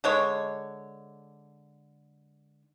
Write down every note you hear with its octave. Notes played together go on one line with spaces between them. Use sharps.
D3 G#3 C#5